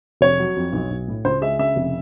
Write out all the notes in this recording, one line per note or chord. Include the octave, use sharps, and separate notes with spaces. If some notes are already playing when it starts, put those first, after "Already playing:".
F1 C#5
F#3
F2
B1
B1
A2
C#2 C5
G#3 E5
C#3 E5
F1